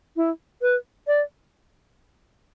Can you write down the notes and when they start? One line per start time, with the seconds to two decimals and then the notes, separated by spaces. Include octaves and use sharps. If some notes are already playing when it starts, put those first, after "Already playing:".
0.16 E4
0.62 B4
1.07 D5